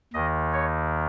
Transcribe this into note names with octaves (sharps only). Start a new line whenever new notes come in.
D#2 D#3 D#5
C#5